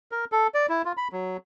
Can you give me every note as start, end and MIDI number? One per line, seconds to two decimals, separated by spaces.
0.12 0.25 70
0.32 0.47 69
0.54 0.66 74
0.69 0.82 64
0.85 0.92 65
0.97 1.08 83
1.12 1.37 54